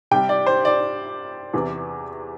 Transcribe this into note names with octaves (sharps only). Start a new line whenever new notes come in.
C3 G3 G5
D5
C5
D5
E2 C3 E3